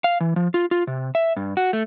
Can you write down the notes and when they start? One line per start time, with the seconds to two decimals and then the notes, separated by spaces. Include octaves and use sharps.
0.04 F5
0.20 E3
0.36 F3
0.54 F4
0.71 F4
0.87 C3
1.15 E5
1.36 G2
1.57 F#4
1.73 A3